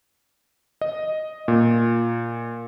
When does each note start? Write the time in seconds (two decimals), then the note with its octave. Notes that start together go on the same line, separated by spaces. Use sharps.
0.81 D#5
1.48 A#2